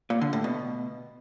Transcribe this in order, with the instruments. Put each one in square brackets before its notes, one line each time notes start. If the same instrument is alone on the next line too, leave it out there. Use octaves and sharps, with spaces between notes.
[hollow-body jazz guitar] A#2
D3
A2
B2